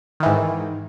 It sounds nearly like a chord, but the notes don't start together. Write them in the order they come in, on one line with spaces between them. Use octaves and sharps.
D#3 E3 G#2